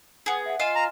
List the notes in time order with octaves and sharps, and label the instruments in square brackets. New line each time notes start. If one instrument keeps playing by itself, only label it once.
[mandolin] B3 G#4
[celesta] E5 F#5
[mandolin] F4 F5 [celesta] D#5 G#5 E7
[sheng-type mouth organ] A#5